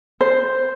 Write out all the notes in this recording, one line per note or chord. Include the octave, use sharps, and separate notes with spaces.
C5